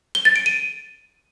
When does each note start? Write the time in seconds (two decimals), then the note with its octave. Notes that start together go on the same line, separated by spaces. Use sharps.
0.15 G7
0.25 A6
0.36 D7
0.46 D#7